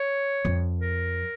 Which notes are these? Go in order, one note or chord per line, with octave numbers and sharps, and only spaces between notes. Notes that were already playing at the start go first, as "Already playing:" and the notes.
Already playing: C#5
F2
A#4